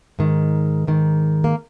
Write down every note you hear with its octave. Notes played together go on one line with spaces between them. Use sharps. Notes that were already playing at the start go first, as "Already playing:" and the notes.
G#2 D#3
G#2 D#3
A#3